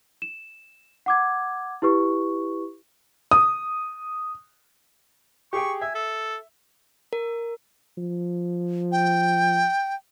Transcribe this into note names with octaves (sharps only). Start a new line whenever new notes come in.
E7
F#5 D6 G#6
E4 G4 B4 C#6
D#6
G4 G#4 G5 C#6
E5 G#5
A4
A#4
F3
G5